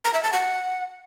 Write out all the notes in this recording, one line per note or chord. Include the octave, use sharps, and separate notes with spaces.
A#5
E5
A5
F#5